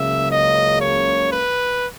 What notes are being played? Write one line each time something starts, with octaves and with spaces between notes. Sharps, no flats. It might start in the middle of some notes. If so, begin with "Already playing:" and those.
Already playing: C#2 C#3 F#3 A#3 E5
D#5
C#5
B4